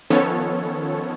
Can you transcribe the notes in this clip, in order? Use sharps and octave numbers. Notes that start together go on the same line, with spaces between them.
D#3 F3 B3 C#4 A4 C#5